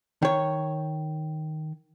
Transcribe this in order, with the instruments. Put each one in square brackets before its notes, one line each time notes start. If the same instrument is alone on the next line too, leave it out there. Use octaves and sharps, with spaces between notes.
[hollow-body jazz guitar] D#3 C#5